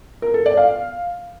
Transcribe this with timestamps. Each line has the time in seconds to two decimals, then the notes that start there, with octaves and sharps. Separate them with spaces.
0.22 A#4
0.34 A4
0.46 D5
0.57 F5